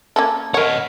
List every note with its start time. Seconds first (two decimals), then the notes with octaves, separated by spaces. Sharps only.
0.16 A#3 C#4 A4
0.54 A#4 C#5 D#5 F#5